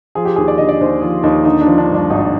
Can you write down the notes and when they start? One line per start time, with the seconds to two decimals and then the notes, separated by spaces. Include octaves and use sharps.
0.15 F3 G#4
0.25 G4
0.36 D#2 G#4
0.48 D5
0.58 D3 D#5
0.69 D5
0.81 D#2 C5
1.02 F3 F4
1.23 D#2 D#4
1.45 D3 D#4
1.61 D4
1.67 F3
1.78 D4
1.89 G2
1.94 D4
2.10 G#1 D#4